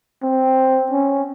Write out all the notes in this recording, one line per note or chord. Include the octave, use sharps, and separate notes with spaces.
C4
C#4